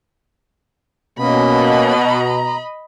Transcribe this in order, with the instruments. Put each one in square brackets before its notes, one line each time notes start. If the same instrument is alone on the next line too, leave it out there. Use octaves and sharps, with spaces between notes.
[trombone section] B2 [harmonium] A#3 C#4 [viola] D#5 B5
[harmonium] A#5